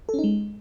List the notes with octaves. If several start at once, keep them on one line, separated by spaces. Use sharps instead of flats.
A4
C#4
D#4
G#3